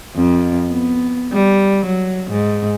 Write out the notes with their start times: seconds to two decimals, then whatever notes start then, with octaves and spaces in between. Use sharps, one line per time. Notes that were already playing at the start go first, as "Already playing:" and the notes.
0.16 F2
0.69 B3
1.33 G3
1.86 F#3
2.31 G#2